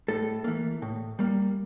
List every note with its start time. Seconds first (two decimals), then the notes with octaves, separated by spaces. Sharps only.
0.08 A2 A4
0.44 E3 A#3
0.82 A2
1.19 G3 A#3